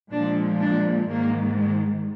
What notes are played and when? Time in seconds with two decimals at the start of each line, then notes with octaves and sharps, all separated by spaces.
0.11 A#2 F3 G#3 D4
0.60 D4
1.08 G#2 D#3 G#3 A#3
1.57 G#3